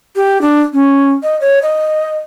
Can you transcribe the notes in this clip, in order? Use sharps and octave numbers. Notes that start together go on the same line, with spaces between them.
G4
D4
C#4
D#5
C#5
D#5